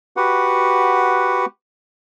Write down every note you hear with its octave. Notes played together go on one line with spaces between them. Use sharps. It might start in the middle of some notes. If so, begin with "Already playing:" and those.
F#4 G4 B4 F#5